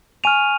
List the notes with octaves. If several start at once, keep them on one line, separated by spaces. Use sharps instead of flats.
G#5 C#6 F6 D#7 F7